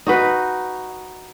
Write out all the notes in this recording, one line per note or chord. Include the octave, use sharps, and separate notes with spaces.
D#4 F#4 B4